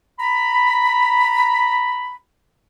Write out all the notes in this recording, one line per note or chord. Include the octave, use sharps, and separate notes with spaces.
A#5 B5